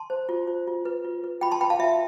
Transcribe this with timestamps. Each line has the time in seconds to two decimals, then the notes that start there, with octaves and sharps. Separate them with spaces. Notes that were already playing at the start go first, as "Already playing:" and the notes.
Already playing: A5 C6
0.10 C5
0.29 F4
0.47 C5
0.67 F4
0.85 B4
1.04 F4
1.24 B4
1.41 F4 G5 B5
1.51 A5 C6
1.60 B4 G5 B5
1.70 F5 A5
1.79 F4 E5